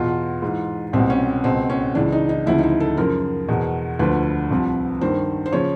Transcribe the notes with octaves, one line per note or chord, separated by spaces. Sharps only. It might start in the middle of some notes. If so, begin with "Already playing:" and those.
Already playing: E2 B2 F4
G#2 E3
C2 B2 C4
C#4
C#2 B2 C4
C#4
C#2 C#3 E3 D4
D#4
D#4
D2 C#3 F3 E4
D#4
E4
A4
F#2 C#3 F3 A#4
E2 B2
D2 D3 F3 B4
C2 C3 F3
G2 D#3 C5
C5
C#3 F3 C#5